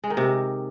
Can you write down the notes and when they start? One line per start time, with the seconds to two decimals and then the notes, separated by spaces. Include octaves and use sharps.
0.04 G#3
0.10 D#3
0.17 C3